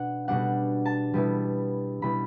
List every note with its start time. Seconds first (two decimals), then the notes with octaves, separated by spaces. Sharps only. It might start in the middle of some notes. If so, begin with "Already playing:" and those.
Already playing: B2 D4 F#5
0.28 B2 G3 D4 F#5
0.85 A5
1.14 B2 G3 B3 E4
2.02 B2 G3 B3 E4 B5